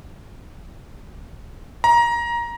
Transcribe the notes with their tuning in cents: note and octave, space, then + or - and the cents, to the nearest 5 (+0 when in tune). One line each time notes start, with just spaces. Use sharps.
A#5 +20